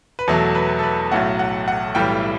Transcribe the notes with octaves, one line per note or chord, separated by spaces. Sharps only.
B4
E2 B2 F#3 A3 A4
B4
A4
B4
B1 A2 F#3 A3 F#5
F#5
F#5
B1 A2 E3 G3 G5